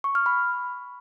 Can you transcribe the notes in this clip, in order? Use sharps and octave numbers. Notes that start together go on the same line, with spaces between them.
C#6
F6
B5